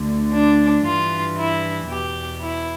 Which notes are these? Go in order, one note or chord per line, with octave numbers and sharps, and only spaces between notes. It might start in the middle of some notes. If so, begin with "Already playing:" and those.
Already playing: D2 D3
D4
G2 E3 F4
E4
E2 B2 G4
E4